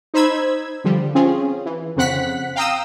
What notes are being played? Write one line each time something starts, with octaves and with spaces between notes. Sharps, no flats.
D#4 C5 B5 E6 G#6
D3 F3 G3
C4 C#4 F4 G#4
E3
F2 C#3 C4 F#5 F#6 B6
F5 G5 A#5 D#6 E6